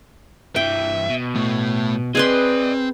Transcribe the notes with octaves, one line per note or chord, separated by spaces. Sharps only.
G2 E3 E5 G5
B2
A2
C4 G#4 B4 D5 D#5 C6